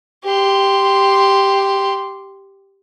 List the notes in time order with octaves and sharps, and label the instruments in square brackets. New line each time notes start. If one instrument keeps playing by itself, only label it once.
[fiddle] G4 C6